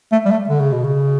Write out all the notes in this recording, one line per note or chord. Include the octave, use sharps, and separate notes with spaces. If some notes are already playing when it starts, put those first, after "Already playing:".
A3
G3
A3
D3
C#3
B2
C#3